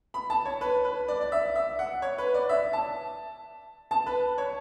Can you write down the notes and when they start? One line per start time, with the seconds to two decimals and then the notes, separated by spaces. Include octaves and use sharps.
0.14 B5
0.30 A5
0.45 C#5
0.61 B4
0.85 B4
1.08 D5
1.21 D5
1.32 E5
1.56 E5
1.79 F#5
2.02 C#5
2.18 B4
2.34 D5
2.49 E5
2.73 A5
3.91 A5
4.06 B4
4.38 C#5